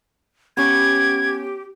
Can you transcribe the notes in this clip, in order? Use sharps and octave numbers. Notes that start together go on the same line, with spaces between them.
B3 C#4 G4 G#6